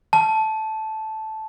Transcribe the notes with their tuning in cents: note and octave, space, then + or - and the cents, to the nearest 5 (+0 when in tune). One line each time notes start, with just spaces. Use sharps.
A5 -10